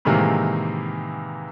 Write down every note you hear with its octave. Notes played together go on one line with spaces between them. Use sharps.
A2 C3 D#3 E3 G#3 A#3